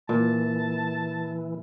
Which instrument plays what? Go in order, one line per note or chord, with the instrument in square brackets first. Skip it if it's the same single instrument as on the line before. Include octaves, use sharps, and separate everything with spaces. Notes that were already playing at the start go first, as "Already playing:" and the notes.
[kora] A#2 [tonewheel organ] E3 [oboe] A5